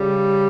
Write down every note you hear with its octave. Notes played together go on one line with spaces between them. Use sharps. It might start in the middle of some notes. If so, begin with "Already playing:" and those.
Already playing: C#3 G3